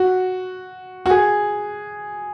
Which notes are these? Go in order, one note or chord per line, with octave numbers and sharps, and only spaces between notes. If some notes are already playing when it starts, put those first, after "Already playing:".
Already playing: F#4
F#4
G#4